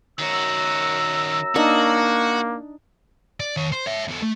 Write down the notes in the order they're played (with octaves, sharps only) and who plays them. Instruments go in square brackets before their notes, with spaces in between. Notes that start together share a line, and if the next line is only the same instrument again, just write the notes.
[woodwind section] F#2 A#5 E6 [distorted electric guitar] D#3 F#4
[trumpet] A#3 [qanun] D4 D#4 [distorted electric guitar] F#4
[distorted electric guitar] D5
D#3 C#5
C5
C#5 E5
E2 A4
A3